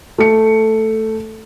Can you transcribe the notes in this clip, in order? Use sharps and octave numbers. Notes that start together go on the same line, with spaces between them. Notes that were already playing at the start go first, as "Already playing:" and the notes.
A3 C#7